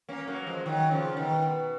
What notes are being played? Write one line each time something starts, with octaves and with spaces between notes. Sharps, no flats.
A#3 C#4
F#3 A#3
F3 G#3
D#3 F#3
C#3 F3
B2 D#3
B2